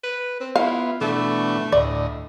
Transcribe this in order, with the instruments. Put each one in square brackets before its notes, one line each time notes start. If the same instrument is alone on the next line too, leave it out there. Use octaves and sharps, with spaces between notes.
[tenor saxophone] B4
C4
[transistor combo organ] B3 F4 [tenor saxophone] E4 [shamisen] F5
[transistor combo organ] B2 E3 D4 [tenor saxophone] A3
[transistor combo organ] D2 A2 D#5 [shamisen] D5